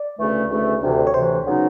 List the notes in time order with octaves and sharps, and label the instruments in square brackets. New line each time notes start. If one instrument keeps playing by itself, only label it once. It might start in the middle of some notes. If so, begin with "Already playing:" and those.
Already playing: [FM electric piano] D5
[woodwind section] D2 C#3 E3 A3
D2 C#3 E3 A3
D2 C3 E3
[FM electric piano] C#5
[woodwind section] D2 C3 E3 [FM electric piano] C5
[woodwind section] C#3 F#3 B3 D#4